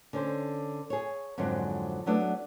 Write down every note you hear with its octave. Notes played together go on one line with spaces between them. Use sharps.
D3 C#4 C5
G#4 C#5
F2 G#2 D3 F#3 G#3 C4
F#3 A3 B3 D4 E4 F#4